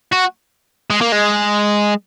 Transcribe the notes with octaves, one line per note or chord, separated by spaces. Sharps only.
F#4
G#3
A#3
G#3